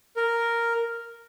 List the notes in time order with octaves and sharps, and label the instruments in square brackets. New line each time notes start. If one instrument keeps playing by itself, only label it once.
[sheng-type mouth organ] A#4